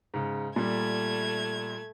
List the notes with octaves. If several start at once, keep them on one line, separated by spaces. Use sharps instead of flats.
G#2 C#3
A#2 G3 A3 G#6